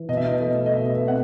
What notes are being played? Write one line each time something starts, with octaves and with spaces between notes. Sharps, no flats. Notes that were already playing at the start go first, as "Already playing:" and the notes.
Already playing: E3
B2 D#5
E5
D#5
A3
D#5
B2 E5
E5
C4 F#5